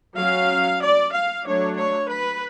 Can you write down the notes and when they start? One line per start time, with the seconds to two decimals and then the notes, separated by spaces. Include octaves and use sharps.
0.18 F#3 C#4 F5
0.83 D5
1.14 F5
1.46 F#3 A3 D4 C#5
1.78 C#5
2.10 B4